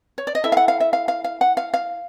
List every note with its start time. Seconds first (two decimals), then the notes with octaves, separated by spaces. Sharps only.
0.18 C#5
0.27 D5
0.35 D#5
0.44 E4 A4 E5
0.52 F5
0.57 F#5
0.68 F5
0.80 E5
0.93 F5
1.08 F5
1.24 F5
1.41 F#5
1.57 F5
1.74 F5